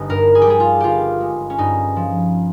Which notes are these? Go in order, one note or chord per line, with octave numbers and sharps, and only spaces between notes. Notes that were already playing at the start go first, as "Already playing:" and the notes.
Already playing: G1 D#4
G2 A#4
G#4
G4
G3 G#4
F4
G1 F4 G4
G#3
C#4
G2 D#4
F3